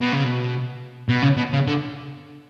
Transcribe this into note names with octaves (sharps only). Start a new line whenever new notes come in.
B2
C#3
B2
B2
C#3
B2
C#3
D3